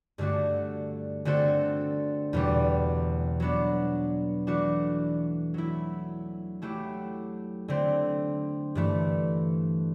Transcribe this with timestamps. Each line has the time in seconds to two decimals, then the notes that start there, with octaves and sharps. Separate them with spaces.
0.18 G2 D3 A3 D4 F#4
1.25 D3 A3 C4 F#4 A4
2.33 E2 B2 G3
3.40 F#3 B3 D4
4.47 E3 A3 D4 F#4
5.54 F#3 A3 E4
6.62 F#3 A3 E4 G4
7.68 D3 A3 C4
8.75 G2 E3 A3